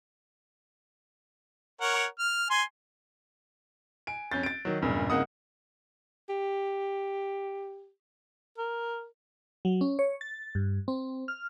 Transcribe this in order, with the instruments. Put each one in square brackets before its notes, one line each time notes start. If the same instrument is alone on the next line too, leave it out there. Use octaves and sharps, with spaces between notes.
[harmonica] A#4 C#5 F#5
F6
G#5 C6
[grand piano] G#5 D7
F2 C#4 G6 A6
A6 D7
D#3 F#3
E1 G2 A#2 C#3
C2 C#3 A#3 D#4 F#5 D#6
[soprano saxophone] G4
A#4
[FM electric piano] F#3
C#4
C#5
A6
G2
C4
F6